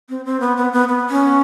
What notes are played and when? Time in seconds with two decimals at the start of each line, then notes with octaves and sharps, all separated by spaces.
0.09 C4
0.25 C4
0.40 B3
0.57 B3
0.73 B3
0.88 B3
1.10 C#4